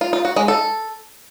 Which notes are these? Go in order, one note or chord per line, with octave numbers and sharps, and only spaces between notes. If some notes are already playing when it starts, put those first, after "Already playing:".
F4
F4
F#4
G#3
A4